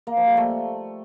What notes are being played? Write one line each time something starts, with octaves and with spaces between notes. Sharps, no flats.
A#3
F3
G3
A3